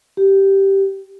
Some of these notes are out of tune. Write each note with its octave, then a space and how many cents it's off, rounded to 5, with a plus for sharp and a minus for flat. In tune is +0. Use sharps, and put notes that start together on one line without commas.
G4 -5